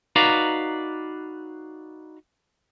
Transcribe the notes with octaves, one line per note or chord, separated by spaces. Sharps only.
D#4 F#4 B4 D5 F5 A#5